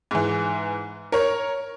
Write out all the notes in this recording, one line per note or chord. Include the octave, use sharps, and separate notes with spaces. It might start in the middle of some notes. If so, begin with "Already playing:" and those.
G#2 E3
A#4 C#5